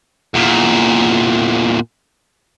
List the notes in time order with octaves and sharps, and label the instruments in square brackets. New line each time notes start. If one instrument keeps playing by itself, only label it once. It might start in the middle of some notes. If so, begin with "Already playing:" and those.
[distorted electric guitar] E2 A#2